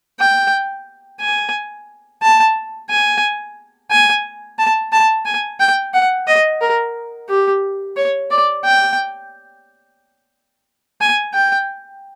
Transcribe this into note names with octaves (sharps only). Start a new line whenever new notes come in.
G5
G#5
A5
G#5
G#5
A5
A5
G#5
G5
F#5
D#5
A#4
G4
C#5
D5
G5
G#5
G5